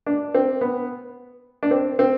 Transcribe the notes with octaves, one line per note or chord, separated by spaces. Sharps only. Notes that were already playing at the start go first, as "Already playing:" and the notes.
D4
C4
B3
D4
C4
C4